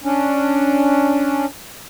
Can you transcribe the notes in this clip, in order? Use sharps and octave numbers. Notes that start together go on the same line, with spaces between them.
C#4 D4